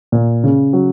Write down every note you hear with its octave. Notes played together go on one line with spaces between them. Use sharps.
A#2
C#3
F#3